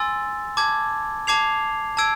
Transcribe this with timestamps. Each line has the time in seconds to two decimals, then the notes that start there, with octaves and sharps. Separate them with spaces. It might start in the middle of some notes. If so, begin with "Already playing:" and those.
Already playing: G#5 C6 E6 A6
0.57 A5 D6 G#6
1.27 A5 D6 G#6 C7 F7
1.97 A5 E6 G#6 D7